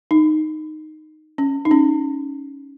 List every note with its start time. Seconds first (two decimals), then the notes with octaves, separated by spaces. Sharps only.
0.11 D#4
1.38 C#4
1.65 D#4
1.71 C#4